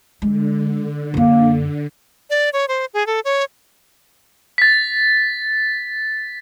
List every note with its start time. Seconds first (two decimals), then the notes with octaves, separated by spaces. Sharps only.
0.22 D3 G#3
1.14 F#2 A#3 D4
2.30 D5
2.53 C#5
2.68 C5
2.94 G#4
3.07 A4
3.25 C#5
4.58 A6 B6